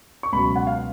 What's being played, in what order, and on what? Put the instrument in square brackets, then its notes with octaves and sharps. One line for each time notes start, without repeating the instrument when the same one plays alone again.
[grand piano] C#6
C#2 B2 F#3 B5
F#5
F5